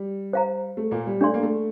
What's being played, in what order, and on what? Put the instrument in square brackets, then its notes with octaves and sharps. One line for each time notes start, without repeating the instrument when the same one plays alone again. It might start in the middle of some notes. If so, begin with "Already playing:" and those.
Already playing: [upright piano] G3
[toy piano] C5 F5 A#5
[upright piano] A3
A#2 A#3
G3
[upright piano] A3 [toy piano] D4 G4 D5 F5 C6
[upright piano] A#3
A3